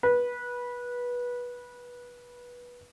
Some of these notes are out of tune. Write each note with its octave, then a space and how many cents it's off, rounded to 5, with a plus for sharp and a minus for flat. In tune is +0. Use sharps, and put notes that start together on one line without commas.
B4 -20